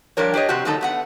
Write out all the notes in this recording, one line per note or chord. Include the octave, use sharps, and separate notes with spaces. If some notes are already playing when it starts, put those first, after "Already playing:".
F3 G3 D4 A#4 C#5
D4 G4 C#5 D#5
C3 C4 F#4 G4
D3 F#3 A3 D#4 A4 A5
A3 B3 F#5